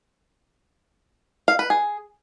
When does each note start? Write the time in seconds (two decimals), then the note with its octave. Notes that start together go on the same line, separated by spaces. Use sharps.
1.48 F5
1.59 B4
1.70 G#4